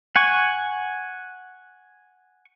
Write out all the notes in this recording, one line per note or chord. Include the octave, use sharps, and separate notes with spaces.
F#5 G#5 C#6